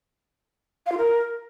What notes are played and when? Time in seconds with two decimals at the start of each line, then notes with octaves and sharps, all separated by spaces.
0.86 F5
0.92 F4
0.98 A#4